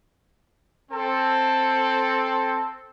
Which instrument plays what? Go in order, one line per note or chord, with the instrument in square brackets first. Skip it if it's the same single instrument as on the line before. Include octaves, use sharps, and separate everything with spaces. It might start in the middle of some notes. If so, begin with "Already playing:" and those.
[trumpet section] C4 A4